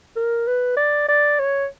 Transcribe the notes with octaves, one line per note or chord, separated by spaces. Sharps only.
A#4
B4
D5
D5
C#5